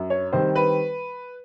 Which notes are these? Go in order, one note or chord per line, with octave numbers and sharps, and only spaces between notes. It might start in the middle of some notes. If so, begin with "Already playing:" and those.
Already playing: F#2
C#5
D#3 G3 C4 C5
B4